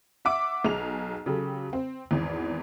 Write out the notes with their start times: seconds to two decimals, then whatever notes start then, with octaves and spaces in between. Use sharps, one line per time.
0.25 E5 F#5 D6 D7
0.65 B1 G#4 F7
1.26 C#3 F#3 G4 A4
1.73 C4
2.11 G#1 E2